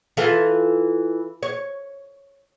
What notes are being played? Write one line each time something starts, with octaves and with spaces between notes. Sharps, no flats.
E3 F4 A4
C#5